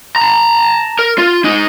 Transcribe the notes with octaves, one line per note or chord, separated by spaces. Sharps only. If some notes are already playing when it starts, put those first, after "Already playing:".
A5 A#5
A#4
F4
D#4 G#5